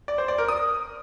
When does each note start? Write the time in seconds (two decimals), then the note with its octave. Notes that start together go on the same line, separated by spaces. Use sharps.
0.08 D5
0.18 C5
0.28 D5
0.38 A#4
0.48 D#6